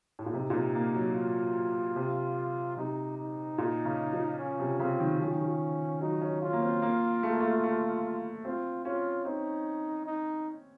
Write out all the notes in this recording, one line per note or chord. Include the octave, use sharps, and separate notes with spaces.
A2
A#2
C3 D#4
A#2
C3
A#3
F#3
F4
C3
C3 D#4
D#4
A#2
C#3
F3
C#4
C3
C#3 C4
D#3
F3 C#4
D#3
F3
F#3 D#4
C#4
C#4 F4
A#3
C4
A#3
A3
A#3
A3
A3
C4 F4
C#4 F4
C4 D#4
D#4